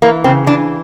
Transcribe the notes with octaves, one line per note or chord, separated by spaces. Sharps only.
E3 A#3
C#3 C4
E3 D4